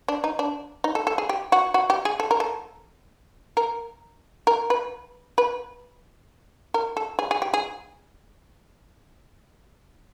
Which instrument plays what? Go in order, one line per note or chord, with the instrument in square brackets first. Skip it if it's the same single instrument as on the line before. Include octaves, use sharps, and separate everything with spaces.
[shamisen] D4
D#4
D4
D#4
A4
A4
G#4
G4
F#4
F#4
G4
G#4
A4
A#4
A4
A#4
A#4
B4
B4
A#4
A4
G#4
G#4
G4
G#4